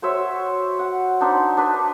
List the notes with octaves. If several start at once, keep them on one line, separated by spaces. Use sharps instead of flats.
F#4 C5 C#5 E5
F#5
D4 D#4 C5 B5
D4 B4